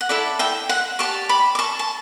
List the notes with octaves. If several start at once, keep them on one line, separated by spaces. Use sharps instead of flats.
F#5
E4 A4 D5 E5
E5 G5
F#5
G4 D5 A5 C#6
B5 D6
D6
A5 C#6
A5